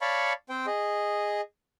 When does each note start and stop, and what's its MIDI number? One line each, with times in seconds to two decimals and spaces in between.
0.02 0.33 73
0.02 0.33 74
0.02 0.33 77
0.02 0.33 81
0.02 0.33 83
0.02 0.33 85
0.49 0.66 60
0.49 0.66 72
0.49 0.66 79
0.67 1.41 68
0.67 1.41 75